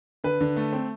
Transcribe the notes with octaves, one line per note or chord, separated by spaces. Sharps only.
D3 B4
D3
A3
C4